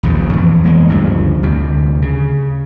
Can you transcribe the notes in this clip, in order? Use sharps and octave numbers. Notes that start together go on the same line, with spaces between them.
A#1 D#2 C#3 F3
F2 E3
E3 G#3 A#3 B3
D2 G2 C#3 F3
D2 C3
C#3